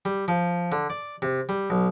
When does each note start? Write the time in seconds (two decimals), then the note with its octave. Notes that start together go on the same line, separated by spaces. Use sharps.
0.05 G3
0.28 F3
0.72 D3
0.90 D5
1.22 C3
1.49 G3
1.70 B1